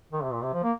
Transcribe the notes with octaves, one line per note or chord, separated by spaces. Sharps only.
D#3
C3
A#2
C3
F3
A#3